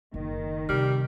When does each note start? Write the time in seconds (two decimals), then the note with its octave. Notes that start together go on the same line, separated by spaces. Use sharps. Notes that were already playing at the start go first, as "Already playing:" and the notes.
0.14 F#1 D#3
0.69 C3 G3 F6